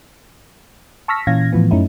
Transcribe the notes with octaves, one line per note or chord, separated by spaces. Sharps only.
A5 C#6 E6 F6 A#6 B6
A#2 E3 C#4 F5 G#6 A#6
A2 E3 F3 B3
F#2 A3 C#4 D#4 E4